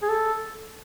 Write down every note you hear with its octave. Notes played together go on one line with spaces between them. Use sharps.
G#4
A4